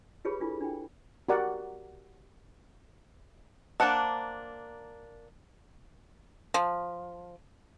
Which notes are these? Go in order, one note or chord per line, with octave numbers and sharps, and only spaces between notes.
F4 G4 G#4 B4 C#5 B5
D4 E4 F4 A4
D4 G5
F#4 G4 A#4 D5 F#5
A#3 D4 C5 F#5 A5
F3